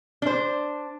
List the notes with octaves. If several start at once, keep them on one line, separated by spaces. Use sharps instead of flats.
D4 C5